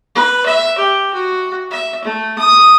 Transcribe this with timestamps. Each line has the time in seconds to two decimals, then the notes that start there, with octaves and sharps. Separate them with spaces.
0.15 B4
0.45 E5
0.78 G4
1.14 F#4
1.70 E5
2.04 A3
2.38 D#6